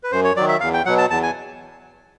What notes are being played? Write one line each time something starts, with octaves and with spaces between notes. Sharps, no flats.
B4
F#2 C5
C#5
D#3 F#3 D5
E5
E2 F5
G5
B2 F#3 F#5
A5
E2 A5
G#5